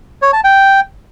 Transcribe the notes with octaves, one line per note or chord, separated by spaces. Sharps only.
C#5
A5
G5